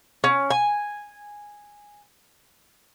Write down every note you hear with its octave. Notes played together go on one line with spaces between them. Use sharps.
C#4
G#5